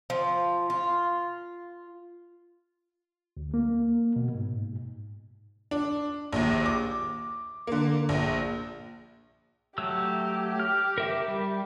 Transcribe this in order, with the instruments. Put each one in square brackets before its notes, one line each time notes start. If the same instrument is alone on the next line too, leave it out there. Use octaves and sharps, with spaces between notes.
[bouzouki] F3
F4
[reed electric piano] D2
A#3
B2
G#2
[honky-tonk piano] D4
A#1 D#2
D6
D3 A#3
A#1
[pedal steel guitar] F#3 A3 E6 [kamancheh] G4
[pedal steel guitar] F6
A#4 E5 D6
G3